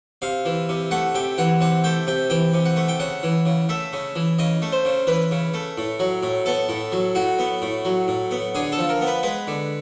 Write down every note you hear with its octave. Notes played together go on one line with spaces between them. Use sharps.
C3 F5
E3
C3
A3 F#5
C3 G5
E3 F#5
C3 F#5
A3 G5
C3 G5
E3 G5
C3
F#5
A3
G5
C#3 F#5
E3
C#3
A3 E5
C#3
E3
C#3 D#5
A3
C5
C#3
E3 B4
C#3
A3
A2
F#3
A2
B3 A4
A2
F#3
A2 F#4
B3
A2
F#3
A2
B3
D3 G#4
A4
F3
A#4
B3
B4
G#3 B4
D3